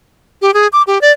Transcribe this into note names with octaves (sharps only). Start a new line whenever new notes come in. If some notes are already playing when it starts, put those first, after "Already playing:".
G4
G#4
D6
G4
D5